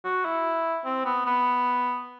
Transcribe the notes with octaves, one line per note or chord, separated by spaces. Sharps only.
F#4
E4
C4
B3
B3